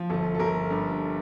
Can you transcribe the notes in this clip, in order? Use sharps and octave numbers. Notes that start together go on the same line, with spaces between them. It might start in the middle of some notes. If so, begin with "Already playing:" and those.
Already playing: F3
G1 A4
A4
G1 A#4
G2